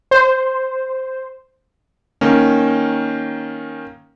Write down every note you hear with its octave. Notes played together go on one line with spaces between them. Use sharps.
C5
D#3 A#3 C#4